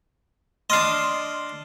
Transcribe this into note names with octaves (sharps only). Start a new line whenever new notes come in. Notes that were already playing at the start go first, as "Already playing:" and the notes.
D4 D#5 C6 F6 C7